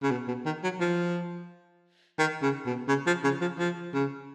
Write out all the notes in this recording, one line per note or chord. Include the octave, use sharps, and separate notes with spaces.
C#3
B2
B2
D#3
F#3
F3
D#3
C#3
B2
C#3
F3
C#3
F3
F3
C#3